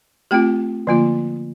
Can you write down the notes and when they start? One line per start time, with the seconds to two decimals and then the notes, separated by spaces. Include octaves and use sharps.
0.31 A3 C4 F4 G4 G5
0.87 D3 F3 A#3 F4